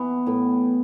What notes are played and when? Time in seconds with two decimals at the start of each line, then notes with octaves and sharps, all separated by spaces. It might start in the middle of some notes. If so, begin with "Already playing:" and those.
Already playing: E3 B3
0.26 A2 B3